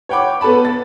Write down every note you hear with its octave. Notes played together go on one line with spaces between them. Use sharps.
C#5 F#5 G5 B5 D6
B3 A4 B4 A5 B5
A6